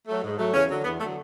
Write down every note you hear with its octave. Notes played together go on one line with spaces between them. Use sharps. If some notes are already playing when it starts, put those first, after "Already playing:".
F#3 A3
G#2
F#3 A3
E2 C#3 C#4
D3 F#3
E2 B3
D3 F#3 A3